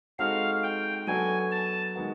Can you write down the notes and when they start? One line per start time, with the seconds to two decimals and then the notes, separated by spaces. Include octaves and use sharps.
0.19 G#3 C4 D#4 F#4 A4 F5
0.63 G5
1.07 F#3 B3 D4 F#4 A4 G#5
1.51 A5
1.95 D#3 G#3 B3 D#4 F#4